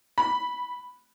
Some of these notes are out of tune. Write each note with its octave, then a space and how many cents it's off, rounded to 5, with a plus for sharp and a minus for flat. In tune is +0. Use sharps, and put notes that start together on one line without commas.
B5 +0